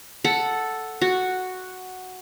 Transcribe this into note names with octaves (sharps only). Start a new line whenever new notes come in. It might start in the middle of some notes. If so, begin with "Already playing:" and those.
A4 F#5
F#4